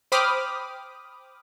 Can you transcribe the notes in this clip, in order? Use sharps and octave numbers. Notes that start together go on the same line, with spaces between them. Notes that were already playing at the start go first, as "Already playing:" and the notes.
C5 G5 B5 D6 D#6 F6